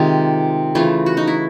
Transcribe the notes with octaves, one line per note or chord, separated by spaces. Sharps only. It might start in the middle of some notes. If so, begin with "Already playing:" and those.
Already playing: C3 D#3 G#3 F4
C#3 E3 A3 F4
F#4
D#4
E4